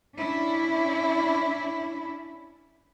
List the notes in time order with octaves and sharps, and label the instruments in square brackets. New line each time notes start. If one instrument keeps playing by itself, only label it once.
[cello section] C#4 D4 E4